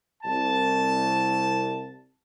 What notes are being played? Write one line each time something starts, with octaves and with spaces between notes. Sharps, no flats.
C2 A5